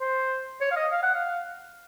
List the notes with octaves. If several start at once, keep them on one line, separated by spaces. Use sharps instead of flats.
C5
C#5
F5
D#5
F5
F#5
F5